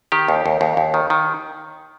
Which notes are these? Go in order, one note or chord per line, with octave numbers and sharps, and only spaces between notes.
D#3 G4
D#2
D#2
D#2
D#2
D#3
D#3